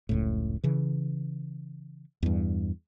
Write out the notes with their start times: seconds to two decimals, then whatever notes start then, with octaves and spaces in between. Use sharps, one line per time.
0.09 F1 C#2 A2
0.64 C#3 E3
2.23 E2 G2